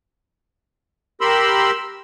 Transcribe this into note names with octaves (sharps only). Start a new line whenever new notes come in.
G4 A#4 B5 C6 E6